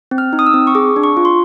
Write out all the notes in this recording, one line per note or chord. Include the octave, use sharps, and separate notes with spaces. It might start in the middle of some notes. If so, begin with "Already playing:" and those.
C4
F6
D#4
D#6
E6
C4
C#6
G#4 D6
D4
C#6
F4
C6